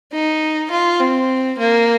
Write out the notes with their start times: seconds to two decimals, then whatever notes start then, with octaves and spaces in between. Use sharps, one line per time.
0.12 D#4
0.71 F4
1.00 C4
1.59 A#3